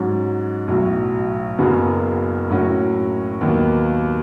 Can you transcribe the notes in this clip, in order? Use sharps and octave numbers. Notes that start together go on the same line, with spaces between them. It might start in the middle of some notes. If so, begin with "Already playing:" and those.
Already playing: G#2 F#3 C#4
B1 A2 F#3
F#1 F#2 C#3 F#3 B3
A2 F#3 C#4 F#4
D#2 D#3 F#3 B3